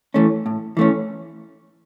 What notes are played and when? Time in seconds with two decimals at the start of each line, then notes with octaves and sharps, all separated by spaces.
0.14 E3 A3 C#4
0.46 A2
0.77 E3 A3 C#4